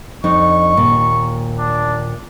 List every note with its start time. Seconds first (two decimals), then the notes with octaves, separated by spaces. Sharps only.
0.24 F2 D4 D#4 C#6
0.77 D#2 A#2
1.59 D4